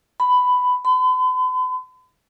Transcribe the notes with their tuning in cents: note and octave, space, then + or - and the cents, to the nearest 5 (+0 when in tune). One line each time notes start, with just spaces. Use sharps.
B5 +10
B5 +45